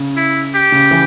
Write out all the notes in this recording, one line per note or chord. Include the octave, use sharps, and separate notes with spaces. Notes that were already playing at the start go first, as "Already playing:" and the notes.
Already playing: C#3
E4
G4
C#3
E3